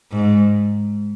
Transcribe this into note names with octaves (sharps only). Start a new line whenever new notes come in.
G#2